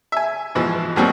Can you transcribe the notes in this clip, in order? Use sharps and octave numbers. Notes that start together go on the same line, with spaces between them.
E5 G#5
G#2 B2 E3 F3
D#2 A#2 D#3 F#3 G3 C4